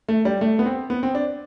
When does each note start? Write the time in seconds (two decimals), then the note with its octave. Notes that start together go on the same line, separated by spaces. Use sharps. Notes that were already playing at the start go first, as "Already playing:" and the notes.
0.08 A3
0.25 G3
0.41 A3
0.59 B3
0.66 C4
0.90 B3
1.03 C4
1.15 D4